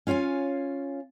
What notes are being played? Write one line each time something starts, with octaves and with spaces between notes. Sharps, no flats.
C#4 F4 C#5 F5 G#5